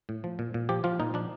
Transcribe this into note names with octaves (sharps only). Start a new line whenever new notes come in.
A2
F3
A#2
A#2
F3 G4
F3 F4
A#2 D#4
F3 D4